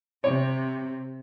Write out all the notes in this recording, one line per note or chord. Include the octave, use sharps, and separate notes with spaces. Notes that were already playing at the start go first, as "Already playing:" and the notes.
C3 C#5